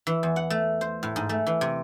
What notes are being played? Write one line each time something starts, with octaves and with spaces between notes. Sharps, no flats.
E3
E2
F#5
A3
C5
A2
G#2
A3
E3
C3